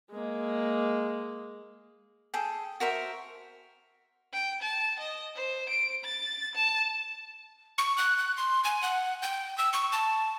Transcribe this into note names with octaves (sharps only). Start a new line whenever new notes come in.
G#3 A#3
G#4 A4 G5
F#4 A#4 C5 E5
G5
A5
D#5
C5
D7
A6
A5
C#6
F#6
F#6
C6
G#5
F#5
G5
E6
C#6
A5